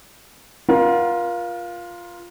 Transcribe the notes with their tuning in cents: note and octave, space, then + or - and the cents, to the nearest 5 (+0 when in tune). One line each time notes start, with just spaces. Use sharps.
F4 +0 A#4 +35 F#5 +0